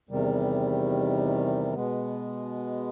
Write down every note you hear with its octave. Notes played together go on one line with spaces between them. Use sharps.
E2 C3 D#3 G3
B2 G#3 B3